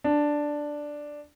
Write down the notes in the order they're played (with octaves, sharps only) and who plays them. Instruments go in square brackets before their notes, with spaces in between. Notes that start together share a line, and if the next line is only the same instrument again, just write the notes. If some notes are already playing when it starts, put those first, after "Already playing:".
[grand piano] D4